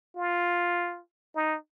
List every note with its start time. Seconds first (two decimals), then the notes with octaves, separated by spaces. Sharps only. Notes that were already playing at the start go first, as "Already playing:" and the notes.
0.16 F4
1.35 D#4